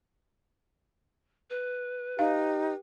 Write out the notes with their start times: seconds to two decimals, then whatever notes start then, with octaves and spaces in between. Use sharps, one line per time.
1.50 B4
2.19 D#4 G4 F5